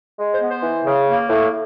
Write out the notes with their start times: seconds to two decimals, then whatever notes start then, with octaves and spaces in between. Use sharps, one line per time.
0.19 G#3
0.34 C5
0.41 B3
0.48 C5
0.63 E3
0.85 C#3
1.07 A#3
1.29 A2